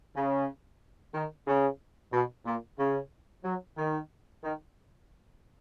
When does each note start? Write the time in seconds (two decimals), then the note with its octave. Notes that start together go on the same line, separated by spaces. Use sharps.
0.16 C#3
1.14 D#3
1.47 C#3
2.13 B2
2.46 A#2
2.79 C#3
3.45 F#3
3.78 D#3
4.44 D#3